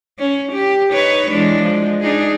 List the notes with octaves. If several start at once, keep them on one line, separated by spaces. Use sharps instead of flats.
C#4
G4
D#4 B4 C#5
E3 G#3 D4
F3 G#3
D4 D#4 G#4